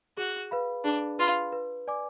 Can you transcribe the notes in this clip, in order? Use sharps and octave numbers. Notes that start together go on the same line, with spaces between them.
F#4 G#4
B4 F5 B5
D4 G#4
F4 B4 F5 B5
B4
D5 G#5 D6